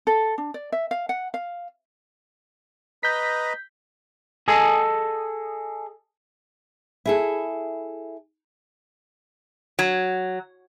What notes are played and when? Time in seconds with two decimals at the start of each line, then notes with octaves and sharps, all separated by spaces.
0.07 A4
0.38 D4
0.54 D5
0.72 E5
0.91 F5
1.09 F#5
1.34 F5
3.03 B4 D#5 A#5 G6 B6
4.48 G#4 A4 D#5 G#5
7.05 E4 G#4 A4
9.79 F#3